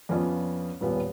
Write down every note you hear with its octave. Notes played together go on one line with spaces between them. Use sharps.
F2 B3 C#4 F4 C#5 D5
D#1 A#2 G3 B3 B4